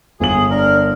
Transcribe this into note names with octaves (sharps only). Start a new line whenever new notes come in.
G1 G#4 F#7
D4 A#4